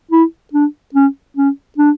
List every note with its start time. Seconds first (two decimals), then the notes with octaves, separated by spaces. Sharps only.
0.11 E4
0.53 D4
0.94 C#4
1.37 C#4
1.78 D4